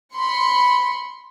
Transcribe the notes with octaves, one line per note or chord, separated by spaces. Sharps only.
B5 C6 C#7